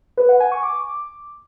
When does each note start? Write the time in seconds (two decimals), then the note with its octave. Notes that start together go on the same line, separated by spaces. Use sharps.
0.17 B4
0.29 F#5
0.40 G#5
0.52 C#6
0.63 D6